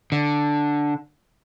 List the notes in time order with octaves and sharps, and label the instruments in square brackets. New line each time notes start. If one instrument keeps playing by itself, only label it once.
[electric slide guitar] D3